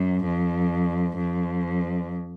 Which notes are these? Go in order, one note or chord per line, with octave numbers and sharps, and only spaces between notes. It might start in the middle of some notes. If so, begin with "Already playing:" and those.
Already playing: F#2
F2
F2